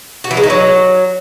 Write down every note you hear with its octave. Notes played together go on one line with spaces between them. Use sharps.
F#4
E3
G#3
D#4
F#3